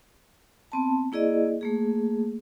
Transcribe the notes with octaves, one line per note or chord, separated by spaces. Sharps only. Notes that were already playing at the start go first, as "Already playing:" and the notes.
B3 C4 A5
A#3 E4 G#4 D5 D#5
A3 A#3 G#4